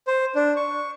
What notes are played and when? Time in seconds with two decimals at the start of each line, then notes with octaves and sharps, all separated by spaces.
0.07 C5
0.35 D4
0.56 C#6